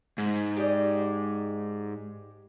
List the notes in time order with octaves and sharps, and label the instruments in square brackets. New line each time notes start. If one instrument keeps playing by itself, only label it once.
[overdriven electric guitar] G#2
[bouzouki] G4 D5 D#5